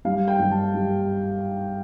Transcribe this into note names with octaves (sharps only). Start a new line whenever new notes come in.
G3 F5
G5
G3
A5
G3